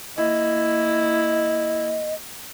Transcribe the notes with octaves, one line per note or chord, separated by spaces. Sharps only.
A#3 E4 D#5